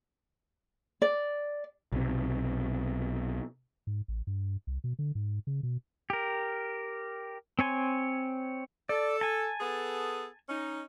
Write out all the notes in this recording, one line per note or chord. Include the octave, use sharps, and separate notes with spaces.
D5
B1 C3
G#2
A1
G2
C2
B2
D3
G#2
C#3
B2
G4 A#4
C4 C#5 G#5 C6
A4 D5
G#5 A5
B3 G#4 A4
C#4 D#4